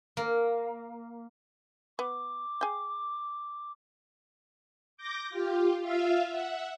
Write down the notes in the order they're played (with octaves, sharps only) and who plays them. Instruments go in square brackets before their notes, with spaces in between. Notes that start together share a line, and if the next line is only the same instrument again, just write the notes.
[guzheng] A#3
[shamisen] B3 [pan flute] D6
[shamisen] G#4 G5
[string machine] D6 G6 A#6
F4 G4
F4 E5 F5
E5 F#5